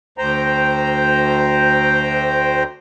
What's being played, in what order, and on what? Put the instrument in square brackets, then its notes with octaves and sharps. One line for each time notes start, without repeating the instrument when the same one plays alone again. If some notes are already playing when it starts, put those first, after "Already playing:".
[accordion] D2 C5 G5 A#5